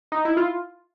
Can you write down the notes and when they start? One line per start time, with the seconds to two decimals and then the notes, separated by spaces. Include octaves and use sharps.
0.12 D#4
0.25 E4
0.37 F4